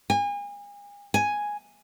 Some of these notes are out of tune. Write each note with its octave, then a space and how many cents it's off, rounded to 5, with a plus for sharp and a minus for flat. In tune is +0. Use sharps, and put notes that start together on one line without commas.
G#5 -35
G#5 +0